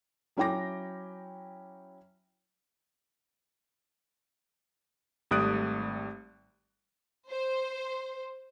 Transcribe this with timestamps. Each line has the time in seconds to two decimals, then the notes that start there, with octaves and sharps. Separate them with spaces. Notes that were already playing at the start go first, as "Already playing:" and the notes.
0.37 F#3 C#4 E4 G5 D6 A#6
5.31 G#1 G3 A3 D#6 F#6 D7
7.30 C5